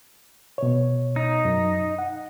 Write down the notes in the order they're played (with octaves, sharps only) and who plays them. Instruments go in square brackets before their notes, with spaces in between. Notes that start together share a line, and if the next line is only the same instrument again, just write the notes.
[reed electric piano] B2 C#5
[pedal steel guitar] D#4
[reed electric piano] F#2
F#5